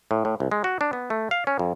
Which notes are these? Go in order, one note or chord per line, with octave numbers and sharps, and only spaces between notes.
A2
A2
C2
G#3
F#4
D4
B3
A3
F5
C#4
F2